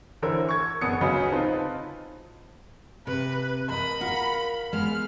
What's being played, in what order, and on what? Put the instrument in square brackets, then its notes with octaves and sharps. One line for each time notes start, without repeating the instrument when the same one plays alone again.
[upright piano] D3 E3 A#4 C5 E6
C#6 G#6
E1 F#2 B2 B3 D#6 C#7
D2 C#3 F#3 B4 D#5
C4 D#4 F4 B4 A5
[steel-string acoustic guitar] C3 [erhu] B4
[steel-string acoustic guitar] A#4 D#5 [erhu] B5
[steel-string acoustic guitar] F4 A#4 F#5
[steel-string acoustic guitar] G#3 B3 [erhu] F6